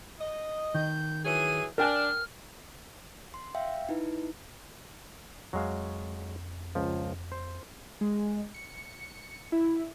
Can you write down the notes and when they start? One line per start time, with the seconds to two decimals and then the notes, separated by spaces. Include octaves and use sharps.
0.20 D#5
0.74 D#3 G6
1.25 E3 F#3 G#4 D#7
1.78 D4 A#4 G5 G#5 F6
3.34 C6
3.55 E5 F5 G5
3.89 D#4 E4 B4
5.53 F2 F#3 G#3 F5
6.75 C#2 F3
7.32 C5
8.01 G#3
8.54 C#7
9.52 E4